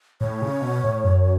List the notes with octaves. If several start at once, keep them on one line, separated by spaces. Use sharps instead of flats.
A2 C#5
C#3
B2
A2
F#2